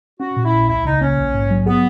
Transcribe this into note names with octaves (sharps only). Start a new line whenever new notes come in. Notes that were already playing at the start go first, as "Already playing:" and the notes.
C#4 F#4
A#2
E4
A#1
C#2 E4
C#3 D#4
A#3 C#4
A#1
G#2
F#3
B3 G#4